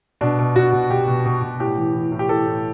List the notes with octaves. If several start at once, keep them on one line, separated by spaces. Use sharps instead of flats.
B2 D4
B2
B2 F#4
B2
B2 G4
B2
B2
B2
A2 G4
E3
E3
A2
G4
E3 A4
A2